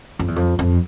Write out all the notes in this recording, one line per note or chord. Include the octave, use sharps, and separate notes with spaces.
F2
E2
F2
F2